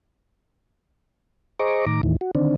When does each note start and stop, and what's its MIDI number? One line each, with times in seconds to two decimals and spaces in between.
1.59 1.85 68
1.59 1.85 72
1.59 1.85 75
1.59 1.85 82
1.59 1.85 85
1.59 1.85 86
1.86 2.01 45
1.86 2.01 51
1.86 2.01 82
1.86 2.01 86
2.03 2.16 39
2.03 2.16 45
2.03 2.16 51
2.03 2.16 52
2.21 2.31 66
2.35 2.56 50
2.35 2.56 51
2.35 2.56 60
2.35 2.56 62